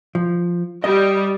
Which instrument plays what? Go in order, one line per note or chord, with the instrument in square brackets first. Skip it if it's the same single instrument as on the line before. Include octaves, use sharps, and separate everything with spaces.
[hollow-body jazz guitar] F3
[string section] G3 [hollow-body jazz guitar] D#5